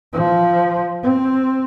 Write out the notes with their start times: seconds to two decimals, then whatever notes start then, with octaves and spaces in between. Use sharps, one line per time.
0.13 F3
1.02 C4